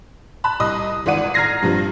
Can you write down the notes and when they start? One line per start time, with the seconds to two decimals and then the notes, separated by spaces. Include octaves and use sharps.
0.44 A5 B5 F#6
0.60 C2 D#5 D#6
1.06 G#1 E3 D5 F#5 D#7
1.34 A#5 F6 G#6 A#6 C7
1.62 G2 C3 F3